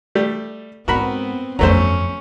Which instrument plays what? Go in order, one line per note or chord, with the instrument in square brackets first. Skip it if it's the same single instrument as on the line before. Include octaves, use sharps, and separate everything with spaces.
[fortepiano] G3 A3 G4
[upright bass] G#2 [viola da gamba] B3 C4 [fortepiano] F#4 A#4 B5
[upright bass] G1 F2 [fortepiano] F#3 A3 C5 [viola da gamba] C#4